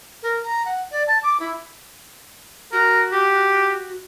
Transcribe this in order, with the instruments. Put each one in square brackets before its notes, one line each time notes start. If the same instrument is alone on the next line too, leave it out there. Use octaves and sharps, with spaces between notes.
[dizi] A#4
A#5
F#5
D5
A5
D6
E4
[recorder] F#4 [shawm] A#4
[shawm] G4